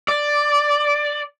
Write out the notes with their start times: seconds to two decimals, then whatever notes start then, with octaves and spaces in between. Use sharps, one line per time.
0.08 D5